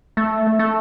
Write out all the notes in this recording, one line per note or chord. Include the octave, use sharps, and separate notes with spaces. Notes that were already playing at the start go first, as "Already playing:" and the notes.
A3
A3